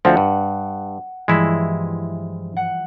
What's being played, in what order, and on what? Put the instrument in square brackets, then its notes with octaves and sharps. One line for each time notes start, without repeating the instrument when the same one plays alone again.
[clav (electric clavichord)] D2 F3 C4 [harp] F#5
[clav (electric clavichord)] G2
[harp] G2 E3 F3 [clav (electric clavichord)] G#3 E4
[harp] F#5